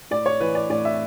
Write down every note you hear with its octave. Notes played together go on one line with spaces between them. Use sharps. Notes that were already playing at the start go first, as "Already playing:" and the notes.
A2 D5
C#5
E3 B4
D5
A2 D5
E5